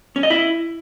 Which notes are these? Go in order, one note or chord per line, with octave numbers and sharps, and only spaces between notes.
C#4
D#5
E4